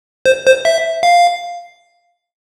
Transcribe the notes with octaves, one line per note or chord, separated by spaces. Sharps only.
C5
C5
E5
F5